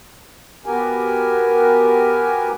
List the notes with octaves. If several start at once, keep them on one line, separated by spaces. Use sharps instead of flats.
B3 F#4 G4 A#4 G#5